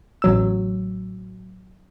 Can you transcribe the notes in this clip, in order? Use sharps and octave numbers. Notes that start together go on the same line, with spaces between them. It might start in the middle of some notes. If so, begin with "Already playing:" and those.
A1 F#3 E6